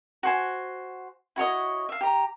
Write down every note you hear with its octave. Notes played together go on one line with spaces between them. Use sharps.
F#4 C5 G#5
E4 F#4 C#5 D#5
E5 F5
G4 A#5